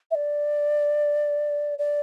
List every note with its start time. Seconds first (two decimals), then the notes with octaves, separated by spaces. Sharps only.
0.11 E5
0.15 D5
1.78 D5